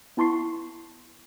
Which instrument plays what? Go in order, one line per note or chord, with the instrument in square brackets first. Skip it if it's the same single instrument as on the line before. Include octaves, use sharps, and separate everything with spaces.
[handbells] B3 E4 A5 C6 C#6 C7